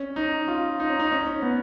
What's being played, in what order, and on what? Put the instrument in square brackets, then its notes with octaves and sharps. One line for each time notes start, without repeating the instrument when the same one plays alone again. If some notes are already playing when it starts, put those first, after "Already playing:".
Already playing: [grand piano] C#4
D#4
F4
D#4
C#4
D#4
C#4
B3